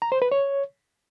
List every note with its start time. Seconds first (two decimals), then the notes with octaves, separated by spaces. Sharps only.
0.02 A#5
0.12 C5
0.22 B4
0.32 C#5